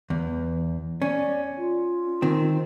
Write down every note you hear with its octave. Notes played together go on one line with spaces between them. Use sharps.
E2 E3
C#4 D5
F4
D#3 C4